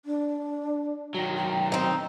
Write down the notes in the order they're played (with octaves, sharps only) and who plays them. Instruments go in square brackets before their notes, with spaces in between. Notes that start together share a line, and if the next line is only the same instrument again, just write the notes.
[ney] D4
[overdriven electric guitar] D#3 F#3 [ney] F#4
[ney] G5
[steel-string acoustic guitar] C4 D#4